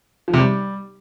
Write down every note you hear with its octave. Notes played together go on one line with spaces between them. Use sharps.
F3
C3
G3